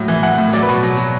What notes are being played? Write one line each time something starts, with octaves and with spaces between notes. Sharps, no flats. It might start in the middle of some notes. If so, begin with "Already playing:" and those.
Already playing: A2 F#3
E3
E3 F#5
A2
F#3 D5
B4
B2
F#3
F#3